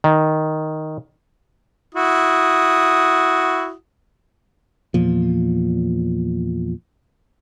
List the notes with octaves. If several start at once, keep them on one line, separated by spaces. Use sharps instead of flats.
D#3
E4 F#4 D#6
E2 A#2 F3